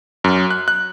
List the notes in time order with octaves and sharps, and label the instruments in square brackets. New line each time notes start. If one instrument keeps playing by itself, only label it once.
[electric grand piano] F#2
F#6
F#6